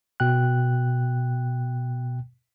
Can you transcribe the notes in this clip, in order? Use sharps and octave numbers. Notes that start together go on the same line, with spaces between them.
B2 G5 F#6